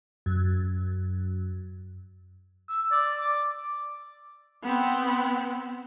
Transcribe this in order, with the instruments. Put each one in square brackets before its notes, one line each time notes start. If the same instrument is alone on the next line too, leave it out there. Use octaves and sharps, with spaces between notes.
[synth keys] F#2
[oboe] E6
D5
D6
[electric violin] B3 C4